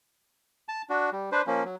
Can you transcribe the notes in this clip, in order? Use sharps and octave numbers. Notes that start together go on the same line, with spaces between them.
A5
D4 F#4
G3
D4 B4 C5
F3 A#3 C#4
F#3